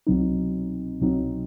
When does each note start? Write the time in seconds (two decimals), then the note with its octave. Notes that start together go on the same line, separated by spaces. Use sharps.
0.07 C2 B2 F#3 C4 D#4
1.01 C2 B2 F#3 C4 D#4